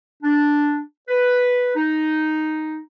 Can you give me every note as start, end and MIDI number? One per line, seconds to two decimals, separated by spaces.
0.23 0.79 62
1.08 1.70 71
1.75 2.79 63